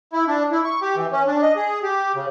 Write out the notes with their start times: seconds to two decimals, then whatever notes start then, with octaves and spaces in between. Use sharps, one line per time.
0.13 E4
0.27 D4
0.51 E4
0.65 C#6
0.81 G4
0.96 E3
1.12 C#4
1.27 D4
1.42 D#5
1.56 G#4
1.83 G4
2.15 C#3